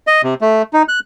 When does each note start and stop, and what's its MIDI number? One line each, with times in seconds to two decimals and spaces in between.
0.07 0.22 75
0.23 0.34 48
0.41 0.62 57
0.73 0.83 63
0.88 0.99 90